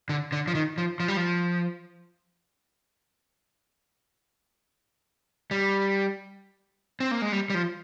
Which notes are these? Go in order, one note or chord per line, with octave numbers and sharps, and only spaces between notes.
D3
D3
F3
D#3
F3
F3
G3
F3
G3
C4
A#3
G#3
G3
G3
F3